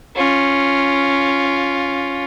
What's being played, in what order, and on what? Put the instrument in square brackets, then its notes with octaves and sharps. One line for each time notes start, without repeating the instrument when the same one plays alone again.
[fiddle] C#4 F4